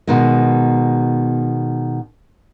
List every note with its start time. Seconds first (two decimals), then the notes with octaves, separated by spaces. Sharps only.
0.07 B2 D#3 G#3